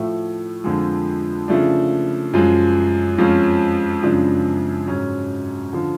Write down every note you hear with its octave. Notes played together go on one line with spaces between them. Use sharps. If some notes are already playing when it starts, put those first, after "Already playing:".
Already playing: A2 F3 A3
F2 D3 F3 G#3
C#3 F3 A3 D4
F#2 F3 G#3
F2 F3 G#3 C#4
F#2 C#3 F3 G#3 D4
G#2 F#3 C#4
D3 F3